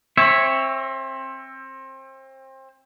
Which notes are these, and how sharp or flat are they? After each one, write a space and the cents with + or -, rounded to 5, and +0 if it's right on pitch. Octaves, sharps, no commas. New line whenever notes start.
C4 +30 C#5 -5 E5 +0